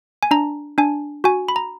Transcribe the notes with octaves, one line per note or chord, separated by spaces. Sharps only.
G#5
D4 A#5
D4 G#5
F#4 G#5
B5
A#5